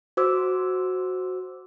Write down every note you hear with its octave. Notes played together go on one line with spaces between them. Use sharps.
F#4 C5 D6 E6